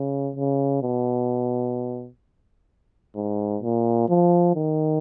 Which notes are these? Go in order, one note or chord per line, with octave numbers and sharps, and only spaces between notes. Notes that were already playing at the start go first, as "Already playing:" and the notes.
Already playing: C#3
C#3
B2
G#2
A#2
F3
D#3